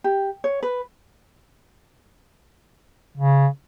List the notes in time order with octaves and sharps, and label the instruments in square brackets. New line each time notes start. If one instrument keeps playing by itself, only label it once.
[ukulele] G4
C#5
B4
[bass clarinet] C#3